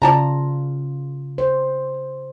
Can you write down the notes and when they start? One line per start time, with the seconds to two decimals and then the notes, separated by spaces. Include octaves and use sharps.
0.02 C#3 F4 D5 A5 A#5
1.38 C5